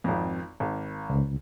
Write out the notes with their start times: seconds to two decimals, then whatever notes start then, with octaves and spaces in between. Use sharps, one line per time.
0.04 G#1 F2
0.60 G#1
1.10 C#2